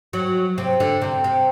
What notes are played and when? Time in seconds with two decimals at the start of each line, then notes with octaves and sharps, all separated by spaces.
0.13 F#3
0.58 C3
0.80 D3
1.01 C3
1.24 C3